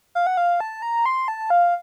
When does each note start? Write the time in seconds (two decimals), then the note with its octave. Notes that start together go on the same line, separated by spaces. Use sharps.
0.15 F5
0.27 F#5
0.37 F5
0.60 A5
0.82 A#5
1.06 C6
1.28 A5
1.50 F5